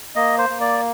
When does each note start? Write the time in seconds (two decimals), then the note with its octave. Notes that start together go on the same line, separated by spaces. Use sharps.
0.16 A#3 D#5
0.38 C5
0.49 A#3
0.61 D5